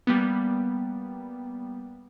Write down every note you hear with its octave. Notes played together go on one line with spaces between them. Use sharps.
G3 A#3 B3